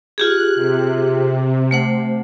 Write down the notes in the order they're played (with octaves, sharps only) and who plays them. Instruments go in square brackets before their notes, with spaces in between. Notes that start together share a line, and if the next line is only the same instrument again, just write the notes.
[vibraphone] F4 G4 G#4 [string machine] F#6
[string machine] C3
[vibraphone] A3 C5 F#5